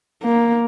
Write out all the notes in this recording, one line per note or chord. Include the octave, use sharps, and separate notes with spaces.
A#3